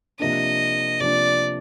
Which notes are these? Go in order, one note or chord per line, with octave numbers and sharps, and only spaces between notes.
C3 F3 A#3 D4 D#5
C3 F3 A#3 D4 D5